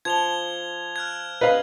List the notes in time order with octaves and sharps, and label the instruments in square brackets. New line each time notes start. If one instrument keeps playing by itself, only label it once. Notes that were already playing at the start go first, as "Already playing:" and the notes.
[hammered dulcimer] F3 [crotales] G#6 F7 G7
[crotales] F6 F#6 G#6
[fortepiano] B4 D#5 F5